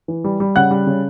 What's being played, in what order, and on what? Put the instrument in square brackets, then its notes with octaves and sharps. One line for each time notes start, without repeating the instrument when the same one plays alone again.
[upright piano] E3
G3
G3
C#3 F#5 F#6
G3
C#3